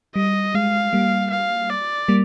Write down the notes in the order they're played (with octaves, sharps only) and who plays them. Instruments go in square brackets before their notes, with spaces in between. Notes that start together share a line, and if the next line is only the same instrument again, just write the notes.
[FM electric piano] G3 [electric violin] D#5
[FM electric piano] G#3 [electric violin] F5
[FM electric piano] G3 A#3
[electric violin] F5
D5
[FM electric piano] G3 A#3